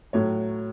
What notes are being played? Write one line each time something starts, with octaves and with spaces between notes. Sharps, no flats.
A2 F#3 A3 C#5